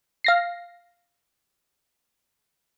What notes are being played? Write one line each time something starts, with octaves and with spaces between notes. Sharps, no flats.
F5 A#6 C7